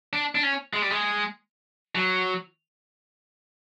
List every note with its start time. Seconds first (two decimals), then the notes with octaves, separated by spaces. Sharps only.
0.13 D4
0.35 D4
0.43 C#4
0.73 G#3
0.82 G3
0.90 G#3
1.95 F#3